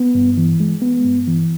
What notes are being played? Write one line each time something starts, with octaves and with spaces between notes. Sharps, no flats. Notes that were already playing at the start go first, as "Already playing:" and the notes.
Already playing: B3
G2
E3
G#3
B3
G2
E3